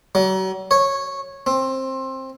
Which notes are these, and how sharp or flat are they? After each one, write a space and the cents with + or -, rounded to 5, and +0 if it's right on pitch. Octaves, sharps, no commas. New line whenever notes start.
F#3 +40
C#5 -10
C4 +20